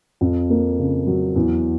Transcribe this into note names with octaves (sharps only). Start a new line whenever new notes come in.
F2
A#3
C#3
F#3
E2